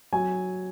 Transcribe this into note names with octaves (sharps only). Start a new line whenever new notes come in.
F#3 G#5